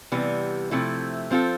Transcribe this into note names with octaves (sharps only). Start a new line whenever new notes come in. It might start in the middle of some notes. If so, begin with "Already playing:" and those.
C3 E3 G3 B3
C3 F3 A3 C4 E4
F3 C4 F4 A4